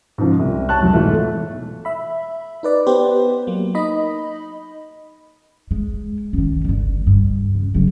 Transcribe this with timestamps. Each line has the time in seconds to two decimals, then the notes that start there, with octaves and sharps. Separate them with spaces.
0.18 G#2 C#3 F3
0.39 C2
0.69 C#5 A5 C#6 F#6
0.81 E2 F#3
0.93 G#2 B2 E3 A3 F4
1.85 E5 B5
2.63 D#4 B4 D5
2.86 B3 G4 B4 C5
3.47 F#3 A#3
3.75 D#4 D#5 B5
5.71 G#3
6.33 D#3 C#4
6.64 G1 D3
7.07 G2
7.55 C#3
7.74 C#3 F#3